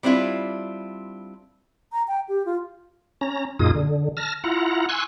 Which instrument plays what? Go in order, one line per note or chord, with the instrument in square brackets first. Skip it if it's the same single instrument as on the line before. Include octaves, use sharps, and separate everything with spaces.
[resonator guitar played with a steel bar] G3 C4 D4 E4 F4
[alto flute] A#5
G5
G4
F4
[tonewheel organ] C#4 A#5
F#2 A#2 D#4 F4 G#4 D#6
D3
A5 F6 A#6
E4 F4 F#5 A#5
G#5 C6 C#6 E6 F#6